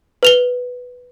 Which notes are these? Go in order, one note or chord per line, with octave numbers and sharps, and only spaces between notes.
B4 F7 G7